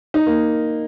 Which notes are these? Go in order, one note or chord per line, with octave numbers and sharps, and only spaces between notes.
D#4
A#3